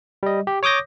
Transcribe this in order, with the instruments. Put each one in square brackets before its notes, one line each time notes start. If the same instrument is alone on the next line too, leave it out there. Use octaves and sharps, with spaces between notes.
[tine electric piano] G3 D#5
G4
C#5 D6 D#6 G6 A#6